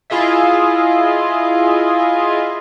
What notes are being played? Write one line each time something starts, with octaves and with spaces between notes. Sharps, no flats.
E4 F4 G#4 D#5 E5